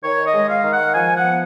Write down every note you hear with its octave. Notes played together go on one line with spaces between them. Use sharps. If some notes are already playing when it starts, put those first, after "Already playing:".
D#3 C#5
D#5
G#3
F5
D#3
F#5
F3 G#5
F#5
B3